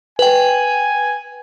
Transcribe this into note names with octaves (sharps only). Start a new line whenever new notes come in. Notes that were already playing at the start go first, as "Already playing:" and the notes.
B4 G5 G#5